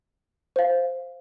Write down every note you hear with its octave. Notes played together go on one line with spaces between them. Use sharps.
C5 F5